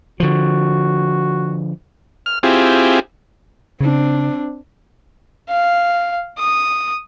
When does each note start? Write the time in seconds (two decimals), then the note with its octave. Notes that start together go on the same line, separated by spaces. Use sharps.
0.20 D3 F3 F#4
2.26 F6
2.43 C4 E4 F4 G4 G#4
3.81 C#3 C4 D4
5.49 F5
6.38 D#6